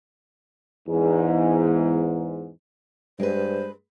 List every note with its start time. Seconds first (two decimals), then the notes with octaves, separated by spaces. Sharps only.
0.88 E2 G#2
3.20 G2 G#3 B4 C5